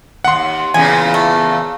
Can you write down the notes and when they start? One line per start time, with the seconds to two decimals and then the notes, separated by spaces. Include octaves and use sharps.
0.24 D#2 F#5 C6
0.74 E2 A#2 C#3 G#5
1.14 A3